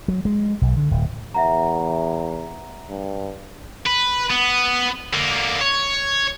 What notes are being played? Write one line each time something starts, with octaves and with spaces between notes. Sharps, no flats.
F#3
G#3
B1
D3
D1
E2 E5 F#5 A#5
G2
B4
B3
D3 A#3
C#5